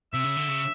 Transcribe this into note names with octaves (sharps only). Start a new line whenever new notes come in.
C3 E5
C#3
D3
C#3